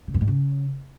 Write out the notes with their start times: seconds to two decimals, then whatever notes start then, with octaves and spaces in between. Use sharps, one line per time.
0.07 C#3
0.14 F#2
0.21 G#2
0.28 C#3